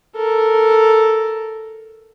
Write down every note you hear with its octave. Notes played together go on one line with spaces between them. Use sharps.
A4 A#4